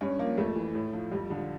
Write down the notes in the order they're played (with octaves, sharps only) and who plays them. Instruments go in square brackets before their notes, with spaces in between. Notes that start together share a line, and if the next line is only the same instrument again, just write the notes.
[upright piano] G2 C#4
F3 A#3
F2 A3
E3
A2
F3
F2 G3
D3 F3